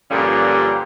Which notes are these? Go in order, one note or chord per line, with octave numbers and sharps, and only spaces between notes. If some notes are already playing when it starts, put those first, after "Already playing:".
G2 A#2 D3 F3 G3 C#4